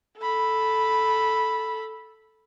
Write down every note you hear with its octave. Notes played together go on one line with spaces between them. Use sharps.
A4 B5